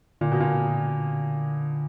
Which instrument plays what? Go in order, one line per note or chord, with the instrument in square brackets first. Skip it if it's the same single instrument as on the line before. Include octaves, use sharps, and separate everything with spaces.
[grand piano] A#2 [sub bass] D3
[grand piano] B2
A#2